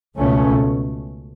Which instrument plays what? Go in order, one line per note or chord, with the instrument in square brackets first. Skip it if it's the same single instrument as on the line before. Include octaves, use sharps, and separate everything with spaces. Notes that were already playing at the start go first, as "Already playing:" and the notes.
[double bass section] C#2 B2 A3 C#4